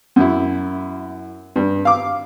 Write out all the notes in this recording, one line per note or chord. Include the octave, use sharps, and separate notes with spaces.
F#2 E4
G2
F5 D6